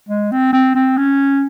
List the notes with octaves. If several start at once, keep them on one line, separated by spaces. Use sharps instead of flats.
G#3
C4
C4
C4
C#4